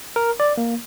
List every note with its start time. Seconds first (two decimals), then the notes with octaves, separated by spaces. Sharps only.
0.16 A#4
0.40 D5
0.57 A#3